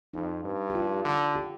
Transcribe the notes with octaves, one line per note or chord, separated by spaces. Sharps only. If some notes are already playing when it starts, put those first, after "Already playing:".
F2 D#4
G2
G4
F4
D3
G4